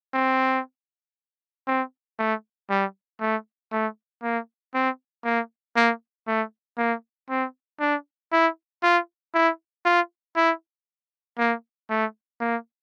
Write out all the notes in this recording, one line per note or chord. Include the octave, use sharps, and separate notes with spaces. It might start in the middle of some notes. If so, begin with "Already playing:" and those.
C4
C4
A3
G3
A3
A3
A#3
C4
A#3
A#3
A3
A#3
C4
D4
E4
F4
E4
F4
E4
A#3
A3
A#3